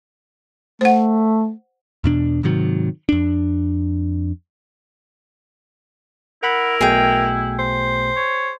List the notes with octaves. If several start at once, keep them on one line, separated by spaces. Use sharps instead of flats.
A3 C5 F#5
E2 B2 D4
G#2 C3 D#3 F#3
F2 D4
E4 A#4 F#5 B5
B1 B2 A3 G#4 G5
C5
C#5